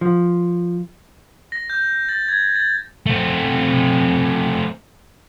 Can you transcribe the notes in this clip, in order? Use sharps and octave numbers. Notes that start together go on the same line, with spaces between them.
F3
A#6
G6
A6
G#6
A6
A3 C4